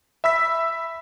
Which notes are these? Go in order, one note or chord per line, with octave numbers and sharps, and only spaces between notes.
E5 B5 E6 B6